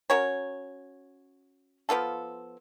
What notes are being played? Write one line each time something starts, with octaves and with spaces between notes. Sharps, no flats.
C#4 F#4 A#4 C#5
F3 B3 F4 A4